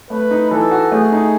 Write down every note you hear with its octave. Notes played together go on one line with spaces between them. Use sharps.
A3 B4
D#4
E3 A4
F#4
A3 G#4
D#4